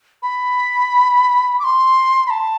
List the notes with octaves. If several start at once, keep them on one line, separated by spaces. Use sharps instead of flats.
B5
D6
C6
B5
A5